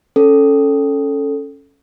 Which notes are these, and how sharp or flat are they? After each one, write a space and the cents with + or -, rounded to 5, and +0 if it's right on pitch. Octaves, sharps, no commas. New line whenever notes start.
C#4 +0 A4 +0